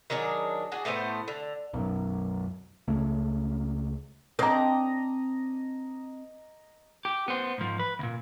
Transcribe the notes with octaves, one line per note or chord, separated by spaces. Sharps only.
D#3 F#3 D4 G#4
D4 F#4 G#4
A2 A3 B3 C5
D3
B1 F#2
C#2 C#3 A3
C4 D4 D#5 A#5
G4
B3 C5
G#2 F3
B4
D2 A#2